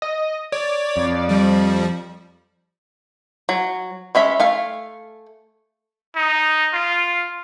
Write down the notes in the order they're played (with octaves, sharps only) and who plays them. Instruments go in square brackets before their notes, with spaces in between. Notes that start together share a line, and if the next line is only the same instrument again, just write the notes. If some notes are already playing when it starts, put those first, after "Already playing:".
[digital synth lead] D#5
[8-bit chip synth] C#5 [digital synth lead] D5
[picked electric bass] F2
[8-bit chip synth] F3 G3
[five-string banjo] F#3
G#3 C#4 E5 B5
A3 F5 G#5
[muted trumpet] D#4
F4